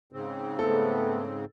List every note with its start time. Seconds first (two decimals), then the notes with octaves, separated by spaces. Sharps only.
0.13 G#2 C#3 C4
0.59 A3 B3 A4